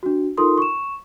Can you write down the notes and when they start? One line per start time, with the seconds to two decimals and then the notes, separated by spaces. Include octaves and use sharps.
0.03 D4 F#4
0.37 D#4 F4 A4 A#4 C6 D#6
0.58 C#6 E7